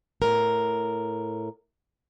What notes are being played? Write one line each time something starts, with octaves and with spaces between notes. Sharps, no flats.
A2 A#4